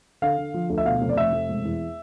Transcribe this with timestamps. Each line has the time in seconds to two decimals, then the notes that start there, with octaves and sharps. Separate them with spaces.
0.22 D3 F5
0.38 D3
0.54 F3
0.70 D2
0.78 E5
0.85 B2 F5
1.02 F1
1.09 D5
1.17 F1 E5
1.33 F1
1.49 E1
1.65 E2